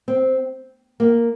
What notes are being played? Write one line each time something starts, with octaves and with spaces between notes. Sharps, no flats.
C4
A#3